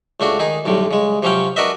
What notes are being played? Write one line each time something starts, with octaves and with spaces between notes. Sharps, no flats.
C#2 A3 D4 F#4
D#3 D#4 G#4
B1 A2 D3 G3
C#3 G#3
C3 F3 F#3 C#4 F5 G5
D4 F#4 A#4 B4 D#5 E5